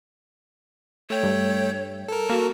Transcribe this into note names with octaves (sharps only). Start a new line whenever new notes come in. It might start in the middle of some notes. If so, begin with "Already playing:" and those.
A3 C#5 G5
G2
A4 A#4
A#3 F#4